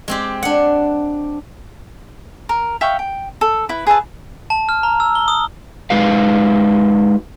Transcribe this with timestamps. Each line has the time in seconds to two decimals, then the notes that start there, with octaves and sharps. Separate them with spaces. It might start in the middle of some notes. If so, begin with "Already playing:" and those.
0.08 G#3 C4 G4
0.43 D4 F#5
2.49 A#4
2.81 E5 F5 G5 C#6
2.99 G5
3.41 A4
3.69 E4 B4
3.87 G#4 B4 E5 A5
4.50 A5
4.69 F6
4.83 A#5
5.00 E6
5.15 G7
5.28 D#6
5.90 G#3 D#4 F#4 B4 F5